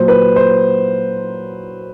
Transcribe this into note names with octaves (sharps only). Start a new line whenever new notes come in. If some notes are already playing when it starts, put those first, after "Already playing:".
Already playing: A#2 F#3 C5
B4
C5